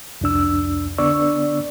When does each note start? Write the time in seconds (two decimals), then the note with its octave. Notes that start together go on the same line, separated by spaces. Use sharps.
0.21 C2 F2 D4 E6
0.98 D3 B3 D4 D5 C#6 E6